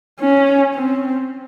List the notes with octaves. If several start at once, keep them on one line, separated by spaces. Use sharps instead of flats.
C#4
C4